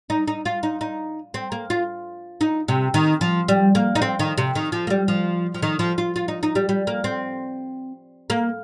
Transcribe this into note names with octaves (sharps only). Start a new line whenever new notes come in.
D#4
D#4
F4
D#4
D#4
C4
A#3
F4
D#4
C3
D#3
F3
G3
A#3
D#4
C4
D#3
C3
D#3
F3
A#3
G3
F3
F3
D#3
F3
F4
F4
D#4
D#4
G3
G3
A#3
C4
A#3